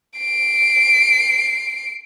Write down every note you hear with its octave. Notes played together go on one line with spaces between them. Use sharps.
C7 D7